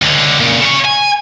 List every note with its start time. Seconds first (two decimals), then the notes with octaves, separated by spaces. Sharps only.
0.02 C#2 D3
0.40 A#2 C#3
0.61 C#3 C#5
0.85 G#5